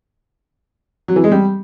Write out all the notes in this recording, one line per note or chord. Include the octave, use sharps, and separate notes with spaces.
F#3
E3
G#3
G3